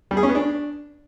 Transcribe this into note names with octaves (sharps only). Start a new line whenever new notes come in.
G3
G#4
C#4
B3
D4